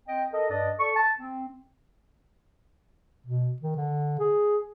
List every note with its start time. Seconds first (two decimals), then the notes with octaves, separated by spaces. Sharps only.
0.08 C4 D#5 G5
0.33 A4 A#4 D#5
0.50 G2 D4 D5 D#5
0.80 A4 D5 C#6
0.96 A5
1.18 C4
3.26 B2
3.62 D#3
3.76 D3
4.19 G#4